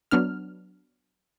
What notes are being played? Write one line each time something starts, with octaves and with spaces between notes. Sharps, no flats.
F#3 B3 D4 F6